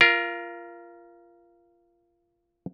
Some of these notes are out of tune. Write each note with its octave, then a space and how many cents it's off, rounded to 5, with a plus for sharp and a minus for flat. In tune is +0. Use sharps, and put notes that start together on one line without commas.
F4 -20 A#4 +15